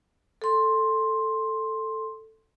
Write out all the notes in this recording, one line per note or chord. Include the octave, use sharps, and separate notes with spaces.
A4 C6